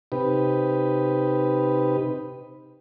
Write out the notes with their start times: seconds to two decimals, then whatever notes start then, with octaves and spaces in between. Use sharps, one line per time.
0.12 C3 D#4 G4 B4